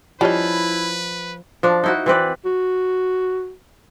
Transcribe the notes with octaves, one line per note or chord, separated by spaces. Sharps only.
F3 G3 C#4 E4 B4 D#5
F3 D4
D#4 E4 F#4
E3 C4 B4 D5
F#4